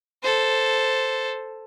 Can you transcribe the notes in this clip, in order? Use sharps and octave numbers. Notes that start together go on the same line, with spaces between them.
A4 C5